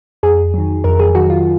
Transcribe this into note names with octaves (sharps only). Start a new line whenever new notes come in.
F2 G#4
D#3 F#3
F2 A#4
G#4
D#3 F#3 F#4
F4